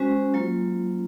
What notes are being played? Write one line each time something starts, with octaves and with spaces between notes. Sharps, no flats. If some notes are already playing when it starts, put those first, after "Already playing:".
Already playing: G#3 C#4 F#4 C5
F#3 A#3 F4